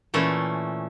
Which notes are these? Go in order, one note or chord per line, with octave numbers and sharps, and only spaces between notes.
A#2 E3 A3 C#4